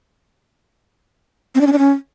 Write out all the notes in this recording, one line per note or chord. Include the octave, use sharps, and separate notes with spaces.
C4
D4
C#4
D4
C#4